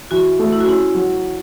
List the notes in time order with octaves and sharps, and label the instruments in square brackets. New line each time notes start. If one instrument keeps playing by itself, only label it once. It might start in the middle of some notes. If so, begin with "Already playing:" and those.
[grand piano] E3 [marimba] F#4
[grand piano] A3
[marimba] E4
F#4
[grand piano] C#4 [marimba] E4
[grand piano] F#3